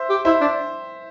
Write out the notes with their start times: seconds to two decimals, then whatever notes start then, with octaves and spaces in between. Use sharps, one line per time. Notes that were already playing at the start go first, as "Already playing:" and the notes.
Already playing: C5 E5
0.10 G4
0.25 E4 C5 E5
0.41 D4